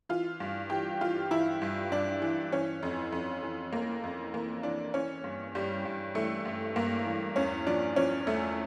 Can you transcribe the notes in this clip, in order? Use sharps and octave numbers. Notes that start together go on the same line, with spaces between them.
E3 F4
G2
E3 G4
E3 F4
E3 E4
G2
G2 D4
E3
E3 C#4
F2
F2
E3
F2 A#3
F2
E3 A#3
E3 D4
E3 C#4
G2
G2 G3
G2
E3 A3
G2
G2 A#3
E3
E2 C#4
F3 D4
F3 C#4
E2 A3